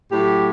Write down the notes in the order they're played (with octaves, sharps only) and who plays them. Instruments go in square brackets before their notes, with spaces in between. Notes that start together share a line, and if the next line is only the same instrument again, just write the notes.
[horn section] A2 F#3 G4